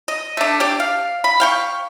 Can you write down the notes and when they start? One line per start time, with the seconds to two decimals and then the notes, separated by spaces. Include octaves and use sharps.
0.08 D#5
0.37 A3 D4
0.60 D4 G4 D5
0.80 F5
1.24 B5
1.40 F5 G5 C#6